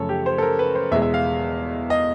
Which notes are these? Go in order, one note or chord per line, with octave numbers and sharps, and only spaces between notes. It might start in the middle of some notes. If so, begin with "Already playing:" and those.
Already playing: F#2 C#3 F3 A3 A4 C#5
G4
C5
A4
A#4
B4
C5
E2 B2 G#3 E5
E5
F5
D#5